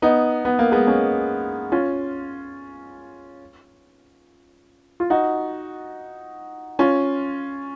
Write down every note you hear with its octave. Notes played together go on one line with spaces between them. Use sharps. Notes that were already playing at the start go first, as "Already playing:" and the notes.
B3 D#4
B3
A#3
G#3 B3
A#3 C#4
C#4 F4
F4
D#4 F#4
C#4 F4